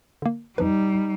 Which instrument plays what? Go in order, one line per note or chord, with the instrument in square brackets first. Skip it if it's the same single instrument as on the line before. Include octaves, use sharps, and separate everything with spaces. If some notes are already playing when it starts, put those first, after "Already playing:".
[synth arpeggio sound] D3 A#3
[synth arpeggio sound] F2 F3 B4 [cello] G3 [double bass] D#4